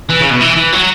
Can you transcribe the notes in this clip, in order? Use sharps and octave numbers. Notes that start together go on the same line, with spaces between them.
E3
C#3
B2
E3
E3
F#3